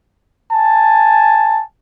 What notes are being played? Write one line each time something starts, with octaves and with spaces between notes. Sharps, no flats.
G#5 A5